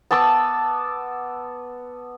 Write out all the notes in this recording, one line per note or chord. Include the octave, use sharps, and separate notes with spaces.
B3 A5 D6 E6